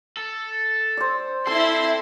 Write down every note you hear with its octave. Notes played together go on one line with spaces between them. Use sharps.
A4
C5 D5
C4 E4 A4 C6